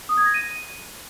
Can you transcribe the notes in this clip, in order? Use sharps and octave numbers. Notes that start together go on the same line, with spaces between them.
D#6
G#6
A#6
D#7